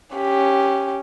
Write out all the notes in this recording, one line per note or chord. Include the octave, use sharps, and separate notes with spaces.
C#4 G4